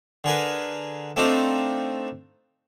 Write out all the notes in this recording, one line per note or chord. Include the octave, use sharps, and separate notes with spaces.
D3 G#4 A#4 B4
A3 C4 D4 D#4 F4